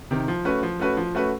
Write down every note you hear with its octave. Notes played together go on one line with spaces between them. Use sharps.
C3 D#3
F3
A3 C#4 F#4 B4
F3
A3 C#4 F#4 B4
F3
A3 C#4 F#4 B4